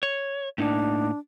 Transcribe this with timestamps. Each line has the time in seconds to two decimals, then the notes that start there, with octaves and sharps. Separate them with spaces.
0.03 C#5
0.58 A2 A#3 D4 D#4